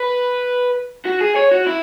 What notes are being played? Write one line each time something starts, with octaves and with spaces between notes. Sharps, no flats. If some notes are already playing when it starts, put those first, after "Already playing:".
Already playing: B4
F#4
G#4
C#5
F#4
E4